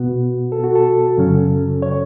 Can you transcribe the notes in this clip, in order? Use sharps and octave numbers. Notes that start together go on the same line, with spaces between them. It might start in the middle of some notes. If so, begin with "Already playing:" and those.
Already playing: B2 B3 F#4
A4
F#4
A4
F#2 C#3 F#3 C#4
C#5